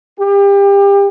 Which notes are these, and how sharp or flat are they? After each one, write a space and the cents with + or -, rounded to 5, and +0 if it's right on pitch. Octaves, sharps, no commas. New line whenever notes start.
G4 +30